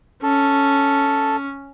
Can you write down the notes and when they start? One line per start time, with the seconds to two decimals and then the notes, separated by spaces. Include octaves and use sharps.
0.23 C#4 A4